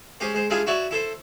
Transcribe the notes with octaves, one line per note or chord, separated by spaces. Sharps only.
G#3 C#4 G4 C5
G#3 C5
G3 G#3 D4 E4 F4 G#4
E4 F#4 C#5 D5 E5
E4 A4 C5